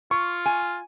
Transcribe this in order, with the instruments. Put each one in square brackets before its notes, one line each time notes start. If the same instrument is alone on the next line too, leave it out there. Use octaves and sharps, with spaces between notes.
[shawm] F4 [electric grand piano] C#6
[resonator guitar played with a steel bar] G#5